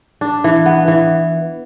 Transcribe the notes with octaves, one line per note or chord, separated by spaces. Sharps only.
D4
E3
B3
E3